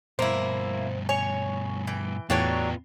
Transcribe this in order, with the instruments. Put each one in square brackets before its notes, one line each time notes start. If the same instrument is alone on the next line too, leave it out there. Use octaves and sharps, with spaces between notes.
[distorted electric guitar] G2 B2 [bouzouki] A#3 E4 [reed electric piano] C5
[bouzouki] C#5 [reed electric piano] G#5
[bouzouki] E3 G5
[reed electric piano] E2 A2 G5 [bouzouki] F#3 D4 C#5 [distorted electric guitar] B3 F4